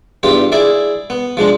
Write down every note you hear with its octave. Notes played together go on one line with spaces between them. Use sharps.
E2 G2 F4 G4
E4 G#4 D5 E5
B3
F3 G#3 D4